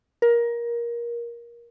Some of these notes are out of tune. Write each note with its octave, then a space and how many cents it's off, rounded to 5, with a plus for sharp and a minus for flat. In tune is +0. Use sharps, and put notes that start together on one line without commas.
A#4 +20